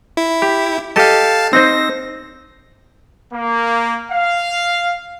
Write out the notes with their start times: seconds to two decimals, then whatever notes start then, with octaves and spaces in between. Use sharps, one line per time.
0.17 E4
0.42 G4
0.96 G4 A4 D#5 F5 A5
1.53 C4 D#4 C5 A#6
3.32 A#3
4.11 F5